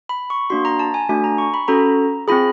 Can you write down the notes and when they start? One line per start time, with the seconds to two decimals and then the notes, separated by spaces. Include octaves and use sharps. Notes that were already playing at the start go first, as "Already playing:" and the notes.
0.09 B5
0.30 C#6
0.50 A#3 D4 F#4 C6
0.65 A#5
0.79 A5
0.94 G#5
1.09 A3 D4 F#4 G#5
1.24 A#5
1.38 C#6
1.54 B5
1.68 C#4 F#4 A4 A#5
2.28 C4 F4 G#4 B5